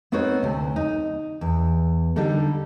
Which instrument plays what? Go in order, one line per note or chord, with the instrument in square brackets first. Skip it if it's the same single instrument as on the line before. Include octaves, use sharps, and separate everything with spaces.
[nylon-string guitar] B3 C4 D#4 F#4 B4 C#5
D2 C3
D#4
E2
D3 G3 D4 D#4 A4